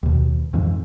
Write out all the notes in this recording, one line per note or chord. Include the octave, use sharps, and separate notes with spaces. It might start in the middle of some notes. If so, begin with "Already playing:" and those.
D#2 B2
F2 G#2 E3